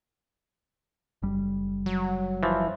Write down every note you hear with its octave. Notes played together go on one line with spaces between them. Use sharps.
F#1 G3
F#3
E3 F3